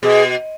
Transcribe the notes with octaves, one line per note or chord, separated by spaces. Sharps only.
B2 G#4